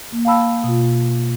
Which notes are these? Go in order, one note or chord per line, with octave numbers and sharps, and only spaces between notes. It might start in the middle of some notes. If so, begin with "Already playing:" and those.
A#3
F5 G5 A5 B5 E6
B2 F4